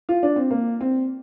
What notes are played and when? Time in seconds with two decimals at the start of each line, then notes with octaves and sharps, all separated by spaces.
0.09 F4
0.23 D4
0.36 C4
0.51 A#3
0.81 C4